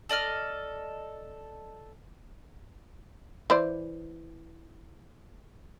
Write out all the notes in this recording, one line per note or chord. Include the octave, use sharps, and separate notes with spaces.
A4 D5 D#5 F6
E3 C5 D5